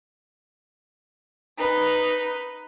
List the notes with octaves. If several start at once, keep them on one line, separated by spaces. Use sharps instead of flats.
D#4 B4